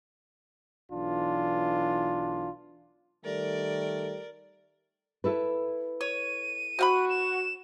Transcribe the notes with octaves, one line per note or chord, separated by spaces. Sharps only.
B1 E3 D4 F4
D#3 G3 A3 A#4 D5
E4 A4 B4
C#5 D#7
C4 F#4 F5 B5
E7